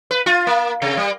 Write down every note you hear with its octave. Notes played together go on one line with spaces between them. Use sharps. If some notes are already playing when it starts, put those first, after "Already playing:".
B4
F4
A#3
C3
G3